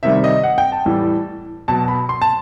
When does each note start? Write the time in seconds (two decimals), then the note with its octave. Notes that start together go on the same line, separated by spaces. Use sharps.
0.03 C3 D#3 G3 E5
0.24 D#5
0.43 F#5
0.58 G5
0.72 A5
0.86 A2 E3 G3
1.68 B2 F#3 A5
1.88 B5
2.09 C6
2.22 A5